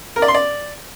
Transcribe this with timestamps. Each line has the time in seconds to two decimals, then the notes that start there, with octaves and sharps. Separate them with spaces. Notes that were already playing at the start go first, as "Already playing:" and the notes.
0.16 A#4
0.22 D5
0.28 C6
0.34 D5